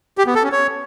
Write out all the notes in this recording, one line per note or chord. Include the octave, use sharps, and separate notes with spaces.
G4
B3
A4
C#4
C#5